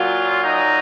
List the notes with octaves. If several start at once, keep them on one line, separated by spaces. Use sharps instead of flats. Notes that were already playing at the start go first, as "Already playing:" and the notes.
Already playing: A#2 F#3 F4
D#4